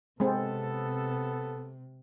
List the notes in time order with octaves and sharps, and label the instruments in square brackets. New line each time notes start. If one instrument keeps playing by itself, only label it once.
[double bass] C3 [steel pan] G#3 C4 [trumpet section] B3 A4